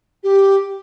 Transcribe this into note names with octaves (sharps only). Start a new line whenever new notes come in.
G4